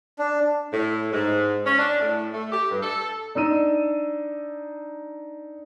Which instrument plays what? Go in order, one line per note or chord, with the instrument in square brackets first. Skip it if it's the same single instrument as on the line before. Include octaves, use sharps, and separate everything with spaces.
[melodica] D4
[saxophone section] A2
G#2
C#4
D4
A2
A3
G4
G2
A4
[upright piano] D4 D#4 E6 D#7